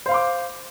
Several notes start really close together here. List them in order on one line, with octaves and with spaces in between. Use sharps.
C5 F5 C6 D6